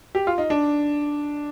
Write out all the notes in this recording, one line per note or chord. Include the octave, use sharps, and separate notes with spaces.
G4
F4
D#4
D4